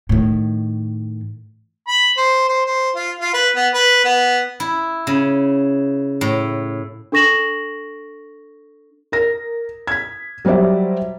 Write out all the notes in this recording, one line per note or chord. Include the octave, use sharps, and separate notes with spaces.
A2 D#3
B5
C5
C5
C5
F4
F4
B4
B3
B4
B3
E4
C#3
A2
D4 A4 C#6 A#6 E7 F#7
A#4 A#6
G#6 B6
F#3 G3 C5 D5 E5